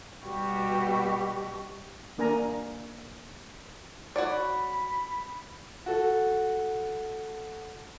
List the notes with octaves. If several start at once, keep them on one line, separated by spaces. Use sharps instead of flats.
B2 G3 F#4 G4
A#3 D4 A#4 G#5 A#5
F#4 C#5 D5 B5
F#4 A4